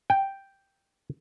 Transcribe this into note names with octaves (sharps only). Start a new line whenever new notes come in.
G5